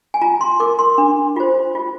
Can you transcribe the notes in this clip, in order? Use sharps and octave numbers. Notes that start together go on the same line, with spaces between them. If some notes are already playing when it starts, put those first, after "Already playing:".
G#5
F4 A#5
C6
A#4 D6
C6
D4
F4 C5
F4